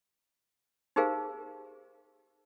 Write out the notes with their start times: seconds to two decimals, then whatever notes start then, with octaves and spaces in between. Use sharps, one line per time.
0.96 D#4 G4 G#4 A#4 C5 F5